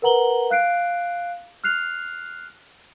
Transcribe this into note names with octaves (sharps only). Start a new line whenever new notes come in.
A#4 B4 F#5 A#5 F#7 G7
F5 F#6 C7 D7
F6 F#6 C7 F7